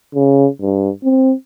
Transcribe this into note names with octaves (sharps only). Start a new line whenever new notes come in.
C#3
G2
C4